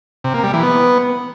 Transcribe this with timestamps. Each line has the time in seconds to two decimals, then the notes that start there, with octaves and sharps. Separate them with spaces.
0.24 C3
0.34 A#3
0.44 G3
0.53 E3
0.63 B3